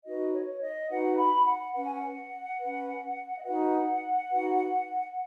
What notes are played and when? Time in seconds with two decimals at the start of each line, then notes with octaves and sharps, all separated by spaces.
0.03 D#4 F#4 B4 D#5
0.33 C#5
0.61 D#5
0.89 D#4 F#4 B4 F#5
1.17 B5
1.46 F#5
1.73 C#4 B4 F#5
1.84 G#5
1.95 F#5
2.59 C#4 B4
3.38 D#5
3.43 D#4 F#4 B4 F#5
4.29 D#4 F#4 B4